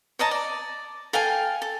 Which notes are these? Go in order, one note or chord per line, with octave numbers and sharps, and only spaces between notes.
C#5 D#5 A5 A#5
D5
A4 F5 G5 G#5
A4